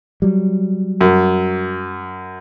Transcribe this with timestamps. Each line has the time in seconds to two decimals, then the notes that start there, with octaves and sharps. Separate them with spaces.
0.22 F#3 G3
1.01 F#2